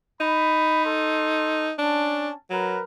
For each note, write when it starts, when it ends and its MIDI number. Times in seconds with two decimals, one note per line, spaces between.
0.21 1.73 63
0.21 0.83 83
0.85 1.70 69
0.85 1.70 84
1.79 2.35 61
1.79 2.31 62
1.79 2.35 81
2.50 2.78 54
2.50 2.83 70
2.50 2.83 71